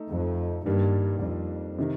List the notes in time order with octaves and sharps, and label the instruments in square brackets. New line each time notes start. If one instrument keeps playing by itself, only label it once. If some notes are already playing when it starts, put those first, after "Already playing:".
Already playing: [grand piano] A3 D#4 A4
[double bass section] F2
[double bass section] G2 [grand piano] D#3 G3 A#3 D4
[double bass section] F2
[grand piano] C3 D#3